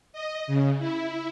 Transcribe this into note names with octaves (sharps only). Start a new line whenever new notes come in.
D#5
C#3
E4